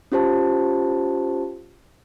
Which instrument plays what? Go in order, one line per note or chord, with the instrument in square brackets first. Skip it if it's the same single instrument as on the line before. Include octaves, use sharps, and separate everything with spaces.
[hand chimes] C#4 F4 G4 C5 A5